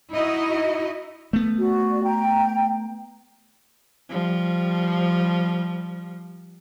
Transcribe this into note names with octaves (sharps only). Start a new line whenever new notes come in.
D#4 E4 F#4 D#5
A3 B3
F#4 D5
G5 A#5
F3 G3